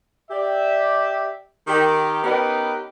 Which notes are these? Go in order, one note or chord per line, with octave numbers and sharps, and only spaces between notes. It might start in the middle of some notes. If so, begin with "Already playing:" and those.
G4 D5 E5
D#3 G4
B3 C#4 D#4 G4 A#4 B4